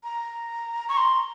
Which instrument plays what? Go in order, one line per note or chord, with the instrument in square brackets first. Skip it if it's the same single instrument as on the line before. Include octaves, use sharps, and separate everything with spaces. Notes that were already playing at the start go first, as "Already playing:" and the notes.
[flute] A#5
[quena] C#6
C6